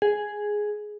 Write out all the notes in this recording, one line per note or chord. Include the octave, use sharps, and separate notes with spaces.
G#4